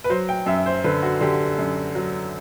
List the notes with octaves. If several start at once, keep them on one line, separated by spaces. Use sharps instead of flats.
B4
F#3 C5
G5
F#2 E5
C5
D3 B4
F#4
D3 G4
F#2
F#3